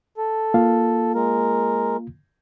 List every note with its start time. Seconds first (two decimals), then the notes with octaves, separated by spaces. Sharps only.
0.17 A4
0.54 A#3 F4 F5
1.15 G#3 A#4